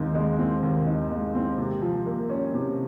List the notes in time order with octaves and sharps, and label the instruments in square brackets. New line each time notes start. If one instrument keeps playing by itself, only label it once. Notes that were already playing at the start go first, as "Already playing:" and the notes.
Already playing: [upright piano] D#2 D#3 G#3 C4
G#3
C4
D#2
D#3
G#3
C4
C3
F3
A#3
C#4
C3